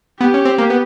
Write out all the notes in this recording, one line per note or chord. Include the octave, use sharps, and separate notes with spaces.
B3 G4
C#4
C4
A#3
B3